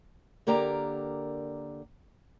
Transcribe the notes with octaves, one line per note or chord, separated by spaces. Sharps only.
D3 A#3 G4 A#4 D5 A#5